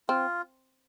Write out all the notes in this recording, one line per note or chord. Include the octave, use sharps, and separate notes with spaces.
C4 F4